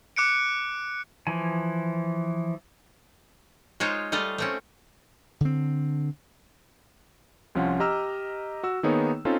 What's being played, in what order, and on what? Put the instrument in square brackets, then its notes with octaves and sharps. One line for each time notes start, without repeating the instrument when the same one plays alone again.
[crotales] D6 F#6 C#7 D7
[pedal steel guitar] E3 F3 G#5
[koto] G#3 D#4 F4 C5 C#5
G3 A3 F4 D#5 F5
A3 C4 C#4
[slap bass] D3 C4
[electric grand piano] C2 F3 C#4 F4 F#5
G4 D#5 A#5 E6 F6
F#4 E6
D#3 A#3 B3 D#4 G#4 C#5
C4 C#4 D#4 F4 A4